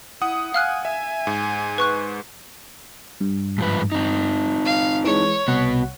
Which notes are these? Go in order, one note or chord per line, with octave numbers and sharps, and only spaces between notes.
E4 F#5 D#6
F5 G#5 F6 F#6
E5 G#5
G#2
B4 C#6 F#6
G2
G#2 F3 B4
C4 D#4
F5
E3 G#3 C#5
C2 B3 F#4 F#5